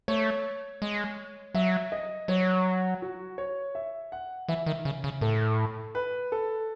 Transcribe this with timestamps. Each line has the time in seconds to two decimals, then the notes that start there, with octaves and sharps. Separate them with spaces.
0.08 A3 C#5
0.82 G#3
1.54 F#3 E5
1.92 D#5
2.28 F#3 C#5
3.02 F#4
3.38 C#5
3.75 E5
4.12 F#5
4.49 E3 E5
4.66 D#3
4.85 C#3
5.04 C#3
5.21 A2 A4
5.95 B4
6.32 A4